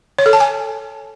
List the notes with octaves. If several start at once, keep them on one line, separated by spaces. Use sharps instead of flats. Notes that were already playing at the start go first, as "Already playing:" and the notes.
C#5
A4
A5
G#5